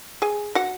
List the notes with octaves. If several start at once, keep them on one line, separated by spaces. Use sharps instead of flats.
G#4 G#5
F#4 F#5